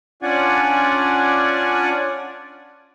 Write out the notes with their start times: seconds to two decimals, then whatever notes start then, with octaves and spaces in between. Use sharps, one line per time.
0.23 C#4 D4 F4 D5 F#5 G#5